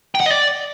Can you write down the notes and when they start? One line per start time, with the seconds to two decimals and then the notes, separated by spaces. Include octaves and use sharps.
0.15 G5
0.20 F#5
0.26 D#5
0.31 D5